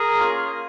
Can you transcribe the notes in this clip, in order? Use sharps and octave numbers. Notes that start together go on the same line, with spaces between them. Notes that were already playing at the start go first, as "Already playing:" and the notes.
Already playing: G#4 A#4
A#3 C#4 F4